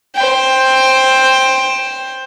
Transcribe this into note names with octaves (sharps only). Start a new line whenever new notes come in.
C5 G5